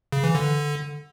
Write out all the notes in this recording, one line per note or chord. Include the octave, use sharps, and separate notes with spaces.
C#3
E3
D3